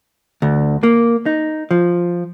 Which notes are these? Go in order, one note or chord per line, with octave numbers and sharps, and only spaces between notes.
D2
A#3
D#4
F3